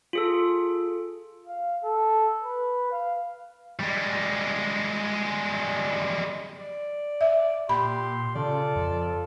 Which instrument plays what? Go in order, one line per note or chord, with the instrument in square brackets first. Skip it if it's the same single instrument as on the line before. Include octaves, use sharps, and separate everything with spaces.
[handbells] F4 G#4 A4
[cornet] F5
A4
B4
F5
[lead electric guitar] G3 G#3
[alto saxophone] D5
[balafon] E5
[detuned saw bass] A#2 [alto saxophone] G4 [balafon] B5 [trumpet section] C6
[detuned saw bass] C#3 [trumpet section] F4 A4 [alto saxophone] D5
[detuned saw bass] F2